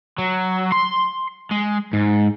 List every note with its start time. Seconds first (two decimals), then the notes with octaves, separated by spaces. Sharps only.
0.18 F#3
0.72 C6
1.51 G#3
1.93 G#2